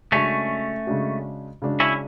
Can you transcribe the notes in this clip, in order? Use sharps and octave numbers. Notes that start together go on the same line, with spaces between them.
C#3 G#3 A3 C#4 D4 F#4
C#3 G#3 D4 F#4
C#3 G#3 D4 F#4
C#4 E4